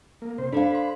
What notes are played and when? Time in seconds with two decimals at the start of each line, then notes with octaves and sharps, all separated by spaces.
0.22 A#3
0.38 C3 C5
0.53 D4 A4 C5 D5 F5 B5
0.75 C6